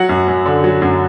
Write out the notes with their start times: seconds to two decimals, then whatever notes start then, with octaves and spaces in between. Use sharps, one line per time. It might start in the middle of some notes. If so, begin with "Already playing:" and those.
Already playing: F#3 F#5
0.09 F#2
0.28 F#2
0.46 D3
0.64 F#3
0.82 F#2